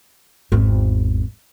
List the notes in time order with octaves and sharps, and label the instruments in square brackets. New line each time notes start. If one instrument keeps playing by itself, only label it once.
[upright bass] G#1 E2